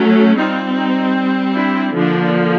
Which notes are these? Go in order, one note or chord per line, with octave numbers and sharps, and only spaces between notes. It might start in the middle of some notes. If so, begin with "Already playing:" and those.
Already playing: F#3 A3 C#4
G3 C4 D#4 F4
D#4
D4 E4
D3 F3 A#3 D4